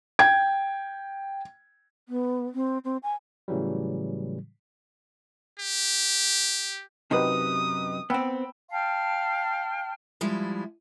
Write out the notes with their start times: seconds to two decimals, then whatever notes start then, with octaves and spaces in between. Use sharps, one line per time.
0.19 G5 G#6
2.09 B3
2.55 C4
2.84 C4
3.03 G#5
3.48 A2 C#3 E3 F#3 G3
5.60 G4
7.11 F#2 C3 D#4 G4 B4 D#6
8.10 B3 C4 G5 B5 E6
8.70 F5 G5 A5 F6
10.21 F3 G3 G#3 E4